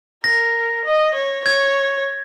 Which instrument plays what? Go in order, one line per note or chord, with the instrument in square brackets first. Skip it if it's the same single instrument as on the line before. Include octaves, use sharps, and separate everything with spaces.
[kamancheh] A#4 [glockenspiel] A#6
[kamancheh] D#5
C#5
[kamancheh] C#5 [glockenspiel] G#6